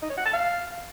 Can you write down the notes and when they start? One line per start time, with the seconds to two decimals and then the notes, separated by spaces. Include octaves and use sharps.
0.02 D#4
0.10 C#5
0.18 F#5
0.26 A5
0.33 F5